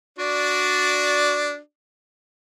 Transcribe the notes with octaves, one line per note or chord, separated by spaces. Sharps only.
D4 F#4 D5